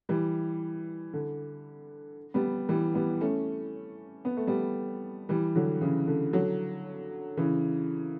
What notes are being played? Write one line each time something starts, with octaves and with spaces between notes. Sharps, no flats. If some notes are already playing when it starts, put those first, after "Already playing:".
E3 G3
D3
G3 B3
E3 G3
G3 B3
A3 C#4
B3
A3
G3 B3
E3 G3
D3 F#3
C#3 E3
D3
D3 F#3
C#3 E3